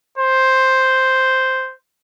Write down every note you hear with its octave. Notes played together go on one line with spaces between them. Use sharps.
C5